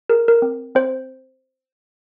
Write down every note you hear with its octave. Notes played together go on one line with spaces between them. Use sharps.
G#4 A#4
A#4
C4
C4 C5